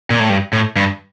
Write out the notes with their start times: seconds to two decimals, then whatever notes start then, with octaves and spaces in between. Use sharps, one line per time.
0.10 A#2
0.20 A2
0.29 G2
0.53 A2
0.76 G2